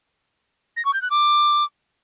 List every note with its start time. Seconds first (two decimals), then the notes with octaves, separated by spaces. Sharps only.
0.77 A#6
0.85 C#6
0.93 G6
1.02 F#6
1.10 D6